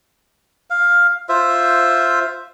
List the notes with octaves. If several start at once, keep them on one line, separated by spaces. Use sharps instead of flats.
F5
F4 C5 E5